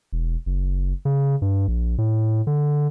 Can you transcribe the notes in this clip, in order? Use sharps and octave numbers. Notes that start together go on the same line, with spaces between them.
E1
F#1
C#3
G2
A#1
A2
D3